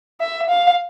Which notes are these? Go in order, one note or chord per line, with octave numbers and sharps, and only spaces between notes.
E5
F5